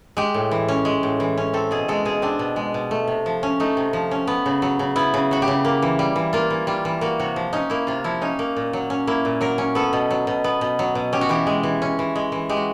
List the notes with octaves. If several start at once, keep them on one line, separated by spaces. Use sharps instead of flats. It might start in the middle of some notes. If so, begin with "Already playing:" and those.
G#3 G4
A2
E3
C#4
G#3
A2
E3
C#4
C4 A4
B2 G#4
G#3 A4
B2 G#4
C4 D4
B2
G#3
B2
A3
C3
F3
C#4
A3 D#4
C3
F3
C#4
B3
C#3
F#3
C#3
B3 E4
C#3
F#3 F#4
G4
C#3
A#3
E3
G3
E3
A#3 F4
E3
G3 F4
E3
A#3 F#4
C3 F#4
F3
C#4 D#4
A#3 E4
C3 F4
F3 E4
C#4 D#4
A#3
A#2
F#3
C#4
A#3 E4
A#2
F#3 A#4
C#4
B3 A4
B2
F#3
B2
B3
B2
F#3
B2
C#4 G4
F#4
E3 G4
G#3
E3
C#4
E3
G#3
E3
G#3 G4
F#4